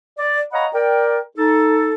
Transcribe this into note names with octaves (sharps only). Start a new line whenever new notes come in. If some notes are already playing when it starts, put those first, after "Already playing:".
D5
C#5 D#5 F5 F#5 A#5 B5
A#4 D5 G5
D#4 A4